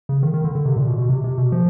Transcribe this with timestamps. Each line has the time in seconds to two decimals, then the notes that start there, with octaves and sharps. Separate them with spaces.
0.09 C#3
0.23 D#3
0.34 D#3
0.44 D3
0.55 D3
0.65 C3
0.76 A#2
0.88 B2
0.98 B2
1.09 C3
1.24 C3
1.38 B2
1.52 F3